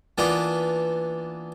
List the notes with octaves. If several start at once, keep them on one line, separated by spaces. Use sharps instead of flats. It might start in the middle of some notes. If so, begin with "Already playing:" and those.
E3 A#3 B3 D4 F4